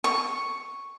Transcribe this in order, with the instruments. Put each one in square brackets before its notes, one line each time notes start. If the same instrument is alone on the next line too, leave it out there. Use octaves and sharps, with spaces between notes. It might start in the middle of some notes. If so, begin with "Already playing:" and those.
[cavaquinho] C#6